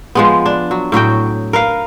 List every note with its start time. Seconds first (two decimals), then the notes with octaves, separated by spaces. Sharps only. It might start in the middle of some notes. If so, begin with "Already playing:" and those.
0.15 F3 G#3 B3
0.46 D4
0.71 F#3
0.92 A2 F#3 F#4 G5
1.53 A#4 B4 F5